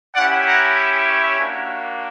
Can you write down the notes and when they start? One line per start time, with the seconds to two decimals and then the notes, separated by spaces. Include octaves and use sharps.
0.14 C#4 E4 G4 D5 F#5
0.45 F#5 A#5
1.08 C#5 E5
1.39 A#3 D4 F#4